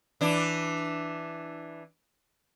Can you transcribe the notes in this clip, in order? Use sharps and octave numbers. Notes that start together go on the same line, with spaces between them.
E3 D4